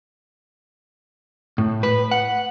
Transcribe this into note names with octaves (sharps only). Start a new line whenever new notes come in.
A2
B4
F#5